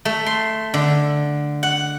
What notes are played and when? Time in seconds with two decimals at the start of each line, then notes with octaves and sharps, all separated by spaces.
0.05 A3
0.26 C6
0.74 D3
1.63 F#5